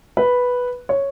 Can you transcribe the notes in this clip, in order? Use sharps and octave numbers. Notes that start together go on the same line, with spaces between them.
B4
C#5